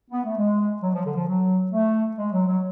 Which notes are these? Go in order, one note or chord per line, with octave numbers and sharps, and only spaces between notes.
B3
A3
G#3
F#3
F3
D3
F3
F#3
A3
G#3
F#3
F#3